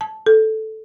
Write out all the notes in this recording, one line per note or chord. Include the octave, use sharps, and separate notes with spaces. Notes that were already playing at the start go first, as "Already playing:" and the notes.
A5
A4